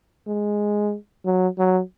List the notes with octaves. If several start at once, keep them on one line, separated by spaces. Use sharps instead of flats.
G#3
F#3
F#3